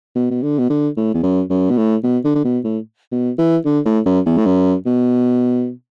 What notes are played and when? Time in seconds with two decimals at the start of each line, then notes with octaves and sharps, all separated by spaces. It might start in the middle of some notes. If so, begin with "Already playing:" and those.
0.16 B2
0.31 B2
0.43 D3
0.59 B2
0.70 D3
0.97 A2
1.14 E2
1.23 F#2
1.50 F#2
1.70 B2
1.77 A2
2.04 B2
2.25 D3
2.35 D3
2.45 B2
2.65 A2
3.12 B2
3.39 E3
3.65 D3
3.85 A2
4.06 F#2
4.26 E2
4.38 A2
4.46 F#2
4.86 B2